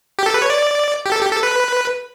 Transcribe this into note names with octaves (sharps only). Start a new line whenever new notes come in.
G4
A4
B4
C#5
D5
G4
A4
G4
A4
B4